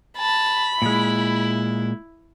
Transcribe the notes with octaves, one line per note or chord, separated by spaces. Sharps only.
A5 B5
A#2 G#3 E4